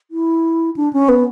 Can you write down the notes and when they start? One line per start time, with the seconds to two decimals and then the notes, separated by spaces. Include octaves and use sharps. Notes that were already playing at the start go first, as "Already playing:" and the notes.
0.11 E4
0.76 D4
0.93 C#4
1.09 B3